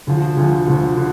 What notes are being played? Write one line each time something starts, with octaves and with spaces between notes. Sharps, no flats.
D2 D3 F3
D2 D3 F3
D2 D3 F3
D3